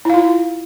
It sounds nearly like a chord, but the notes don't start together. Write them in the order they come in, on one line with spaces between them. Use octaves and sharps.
E4 F5 F4